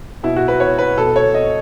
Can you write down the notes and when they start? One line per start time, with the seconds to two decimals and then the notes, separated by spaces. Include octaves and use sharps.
0.23 B2 E4
0.36 F#4
0.48 B4
0.60 C#5
0.79 B4
0.97 B2 A4
1.16 C#5
1.34 D#5